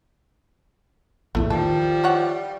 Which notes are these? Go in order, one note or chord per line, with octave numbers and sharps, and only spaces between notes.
A#1 E2 A2 A3
D#3 F3 G3 A4
E3 C#5 F#5